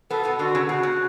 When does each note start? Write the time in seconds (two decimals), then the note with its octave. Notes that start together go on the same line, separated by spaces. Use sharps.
0.10 B2 B3 A4
0.25 B2 B3
0.39 D3 F#4
0.55 C#3
0.69 B2 F#4
0.83 C#3